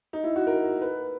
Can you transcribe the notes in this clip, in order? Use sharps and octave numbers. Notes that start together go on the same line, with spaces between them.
D#4
E4
F#4
A#4
B4